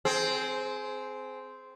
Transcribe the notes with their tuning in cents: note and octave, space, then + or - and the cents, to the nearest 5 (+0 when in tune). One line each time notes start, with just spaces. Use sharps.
C4 -10 G#4 +25